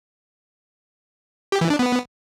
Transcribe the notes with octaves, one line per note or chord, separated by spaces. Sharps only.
G4
E3
D4
B3